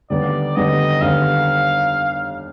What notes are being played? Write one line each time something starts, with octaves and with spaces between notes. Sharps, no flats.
D#2 D3 G3 B3 D5
D#2 D3 G3 B3 D#5
D#2 D3 G3 B3 F5